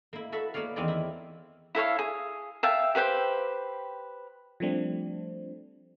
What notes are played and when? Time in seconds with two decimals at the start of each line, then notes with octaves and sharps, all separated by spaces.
0.13 A#3 E4
0.32 F#4 A4 B4 E5
0.54 A#3 B3 C#5 D5 F5
0.76 E2 D#3 C4 D#4 D5
0.88 E4
1.75 E4 A4 C#5 F5
1.99 G#4
2.63 E5 F5 G5 A5
2.95 G4 B4 C5 G5
4.60 F3 G3 A3 C4 D4